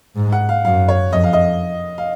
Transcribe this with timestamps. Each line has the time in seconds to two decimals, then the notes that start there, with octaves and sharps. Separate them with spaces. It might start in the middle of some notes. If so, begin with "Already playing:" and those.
0.16 G#2
0.32 F#5
0.49 F5
0.65 F#2 F5
0.88 C#5
1.12 F2 D#5
1.24 F5
1.33 D#5
1.98 F5